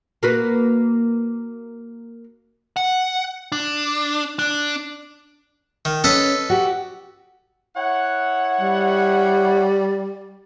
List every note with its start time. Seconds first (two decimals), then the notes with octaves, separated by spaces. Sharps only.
0.23 A#3 F#4 B4
2.76 F#5
3.52 D4
4.39 D4
5.85 D#3
6.04 C#4 A4 B4 D#5
6.50 F#4 G4
7.77 E4 C#5 F#5
8.61 G3